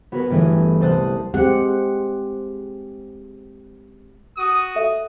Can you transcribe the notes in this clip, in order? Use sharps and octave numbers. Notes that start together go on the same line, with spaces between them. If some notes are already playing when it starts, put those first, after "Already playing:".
B3 F#4 G#4 A#4 B4
G1 E3 A3 G#4
C2 C5 A5 D#6 F#6
G#3 C4 G4 F#5
F#4 D#6
A4 E5